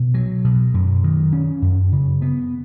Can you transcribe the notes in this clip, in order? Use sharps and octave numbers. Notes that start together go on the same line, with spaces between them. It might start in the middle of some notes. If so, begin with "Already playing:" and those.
Already playing: B2
F#3
B2
F#2
D#3
C#4
F#2
C#3
B3